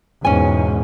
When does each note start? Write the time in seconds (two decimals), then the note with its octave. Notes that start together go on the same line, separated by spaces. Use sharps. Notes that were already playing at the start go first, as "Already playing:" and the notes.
0.25 E2 G#2 B2 C#4 G#5